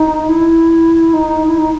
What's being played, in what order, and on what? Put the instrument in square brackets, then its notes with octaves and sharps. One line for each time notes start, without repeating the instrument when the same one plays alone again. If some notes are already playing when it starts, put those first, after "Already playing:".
Already playing: [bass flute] D#4
E4
D#4
E4
D#4